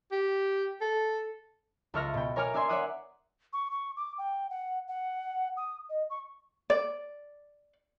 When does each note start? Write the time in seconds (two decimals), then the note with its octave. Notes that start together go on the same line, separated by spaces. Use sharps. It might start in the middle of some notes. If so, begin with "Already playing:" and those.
0.12 G4
0.81 A4
1.94 C#2 A4 E5 C#6 F6 A#6
2.14 B2 G5
2.36 A#4 C#5 G#5 A#5 D6 F6
2.54 D4 D5 E5 G#5 C6
2.69 C#5 D5 E5 F#5 D#6
3.53 C#6
3.71 C#6
3.97 D6
4.18 G5
4.50 F#5
4.88 F#5
5.57 D#6
5.90 D#5
6.10 C#6
6.70 D5